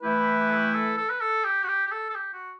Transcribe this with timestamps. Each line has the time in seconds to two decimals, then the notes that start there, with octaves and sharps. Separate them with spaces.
0.03 E3 A3 E4 G4 B4
0.20 G4
0.39 G4
0.50 A4
0.55 G4
0.74 A4
0.97 A4
1.10 B4
1.21 A4
1.44 G4
1.63 F#4
1.68 G4
1.87 G4
1.92 A4
2.10 A4
2.15 G4
2.33 F#4